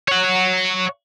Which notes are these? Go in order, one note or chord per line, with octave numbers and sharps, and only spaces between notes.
C#5 F#5